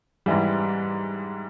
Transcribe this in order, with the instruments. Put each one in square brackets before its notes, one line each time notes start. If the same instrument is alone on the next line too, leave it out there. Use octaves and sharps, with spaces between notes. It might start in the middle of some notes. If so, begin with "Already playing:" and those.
[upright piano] G#2 E3 G3